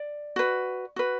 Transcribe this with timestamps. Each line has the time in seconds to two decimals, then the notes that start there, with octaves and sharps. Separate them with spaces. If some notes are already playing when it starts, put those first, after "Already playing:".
Already playing: D5
0.36 F#4 B4
0.96 F#4 B4